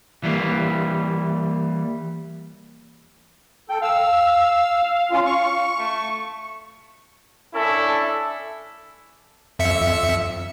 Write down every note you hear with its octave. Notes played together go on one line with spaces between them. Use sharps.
E3 G3 A#3
A4 G5
F5 E6
C#4 F4
C#6
A3
C#4 D4 E4 A4 E5
F2 E5 C#7